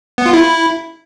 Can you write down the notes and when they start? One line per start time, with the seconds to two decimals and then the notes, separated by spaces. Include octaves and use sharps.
0.18 B3
0.26 F4
0.33 E4